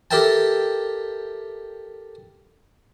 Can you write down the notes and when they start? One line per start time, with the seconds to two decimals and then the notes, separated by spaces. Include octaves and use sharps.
0.11 G4 A4 A#4 E5 G5 A5